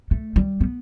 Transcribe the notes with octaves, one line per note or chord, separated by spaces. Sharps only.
A3
G3
B3